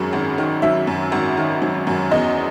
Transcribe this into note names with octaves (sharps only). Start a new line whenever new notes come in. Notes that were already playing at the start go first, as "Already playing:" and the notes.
Already playing: G#1 F#2 D#3 F#3 G#4
G#1
D#3
F#3 E5
F#2
G#1
D#3
F#3
F#2
E2 D#5